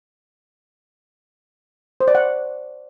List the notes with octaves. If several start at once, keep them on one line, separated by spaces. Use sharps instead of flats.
C5
D5
F#5